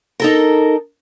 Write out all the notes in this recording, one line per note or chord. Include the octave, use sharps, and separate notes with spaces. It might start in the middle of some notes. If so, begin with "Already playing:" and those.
D#4 A4 A#4